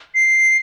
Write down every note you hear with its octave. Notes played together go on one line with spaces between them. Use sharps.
C7